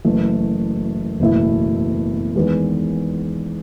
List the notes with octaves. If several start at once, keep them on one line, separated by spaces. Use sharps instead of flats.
F#1 F#2 E3 A3
F#1 E2 B2 A3 E4
E2 D#3 G#3 B3